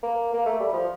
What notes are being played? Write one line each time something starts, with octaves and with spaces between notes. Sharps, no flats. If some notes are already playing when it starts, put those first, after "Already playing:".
A#3
A#3
A3
G3
F3